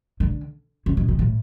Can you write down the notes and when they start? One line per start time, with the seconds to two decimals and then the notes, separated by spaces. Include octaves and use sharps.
0.20 D3
0.86 C#3
0.97 B2
1.08 B2
1.19 A2